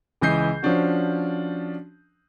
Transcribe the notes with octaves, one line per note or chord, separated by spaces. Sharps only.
C#2 E3 D#5 G6 C7
F3 C#4 D4 F#4